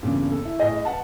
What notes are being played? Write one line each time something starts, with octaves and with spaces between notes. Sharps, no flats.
E2 G2 A#2 C#3
A4
E4
A2 G#4 D#5
B4 F#5 A5